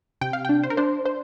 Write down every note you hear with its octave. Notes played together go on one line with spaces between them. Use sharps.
C3 G5
F5
D4 G5
C5
A#4
D4 C5
C5